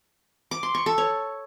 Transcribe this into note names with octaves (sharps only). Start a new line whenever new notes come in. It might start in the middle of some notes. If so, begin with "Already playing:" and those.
D6
C6
C#6
A4
C#5